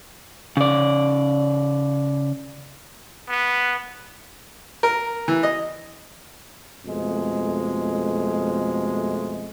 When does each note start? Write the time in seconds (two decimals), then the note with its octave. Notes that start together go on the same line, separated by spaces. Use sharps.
0.57 C#3 D5
3.29 B3
4.83 A#4
5.28 E3
5.43 D#5
6.86 F2 B2 G#3 A3